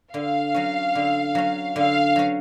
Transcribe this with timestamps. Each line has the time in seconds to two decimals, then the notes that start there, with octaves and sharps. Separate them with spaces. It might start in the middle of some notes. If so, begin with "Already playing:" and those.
0.13 D3 F5
0.54 F#3 C#4
0.95 D3
1.35 F#3 C#4
1.76 D3 F5
2.16 F#3 C#4